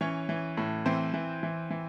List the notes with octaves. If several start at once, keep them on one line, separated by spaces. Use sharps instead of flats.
E3 C#4 C#5
E3
A2
E3 C4 C5
E3
E3
E3